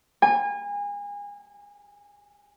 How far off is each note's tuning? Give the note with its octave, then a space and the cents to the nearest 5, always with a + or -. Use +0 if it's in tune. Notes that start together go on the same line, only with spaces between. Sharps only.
G#5 -30